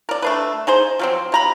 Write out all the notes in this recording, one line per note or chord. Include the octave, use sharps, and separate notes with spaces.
A#4 D5
A3 D4 B4
D#4 G#4 C5
F3 F#3 C4
C3 A#5 B5